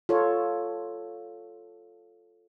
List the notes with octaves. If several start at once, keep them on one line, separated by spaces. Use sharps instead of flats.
F4 A4 C#5